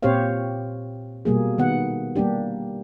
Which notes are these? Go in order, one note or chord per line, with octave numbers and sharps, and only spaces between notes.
A#2 C4 G4 C5 C#5 F5
B2 G3 A#3 G#4
D#3 B3 F#5
G3 A#3 D4 G4